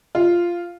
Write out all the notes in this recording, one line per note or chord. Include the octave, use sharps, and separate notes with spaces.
F4